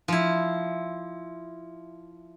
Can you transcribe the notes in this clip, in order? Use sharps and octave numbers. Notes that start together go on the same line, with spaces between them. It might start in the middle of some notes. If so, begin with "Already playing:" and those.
F3 E4